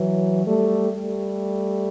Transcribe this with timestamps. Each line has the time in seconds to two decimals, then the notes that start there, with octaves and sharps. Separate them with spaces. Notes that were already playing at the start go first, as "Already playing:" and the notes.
Already playing: E3 F#3
0.46 G3 A3
0.92 G3 A3